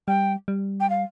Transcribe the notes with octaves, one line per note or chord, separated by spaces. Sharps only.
G3 G5
G3
G5
F5